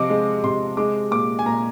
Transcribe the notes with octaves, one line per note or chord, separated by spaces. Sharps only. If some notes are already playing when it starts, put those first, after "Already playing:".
Already playing: C3 F3 D#5 D6
G#3
C3 C6
G#3 D6
A#2 D6
G#5
A#2 A#5